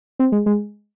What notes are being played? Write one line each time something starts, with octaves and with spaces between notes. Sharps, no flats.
C4
G#3
G#3